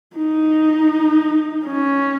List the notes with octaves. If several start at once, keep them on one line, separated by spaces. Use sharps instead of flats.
D#4
C#4